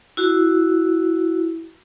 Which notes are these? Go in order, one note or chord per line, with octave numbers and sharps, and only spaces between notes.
E4 F#4